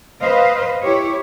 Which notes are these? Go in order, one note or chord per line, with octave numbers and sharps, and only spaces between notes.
B4 C5 D#5 F5
E4 G4 C#5